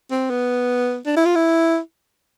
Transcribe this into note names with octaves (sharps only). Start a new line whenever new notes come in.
C4
B3
D4
E4
F4
E4